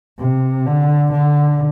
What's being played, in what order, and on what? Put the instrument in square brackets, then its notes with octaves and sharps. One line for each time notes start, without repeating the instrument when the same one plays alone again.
[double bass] C3
D3
D3